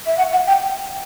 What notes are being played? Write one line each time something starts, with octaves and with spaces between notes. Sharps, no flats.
E5
F#5
F#5
G5